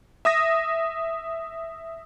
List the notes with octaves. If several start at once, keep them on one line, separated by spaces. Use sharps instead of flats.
E5 D#6 A#6